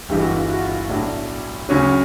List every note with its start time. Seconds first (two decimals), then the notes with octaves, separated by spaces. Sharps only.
0.09 G1 G2 E3 G#3 G4
0.19 F#4
0.29 F4
0.40 E4
0.50 F#4
0.59 F4
0.69 E4
0.89 B1 A2 F#3 D4
1.69 D2 C#3 F#3 C#4